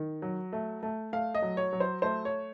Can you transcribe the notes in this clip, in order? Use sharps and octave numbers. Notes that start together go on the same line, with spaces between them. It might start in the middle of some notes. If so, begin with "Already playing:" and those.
Already playing: D#3
F#3
A3
A3
A3 F5
D#5
F#3
C#5
F#3
C5
A3 C5
C#5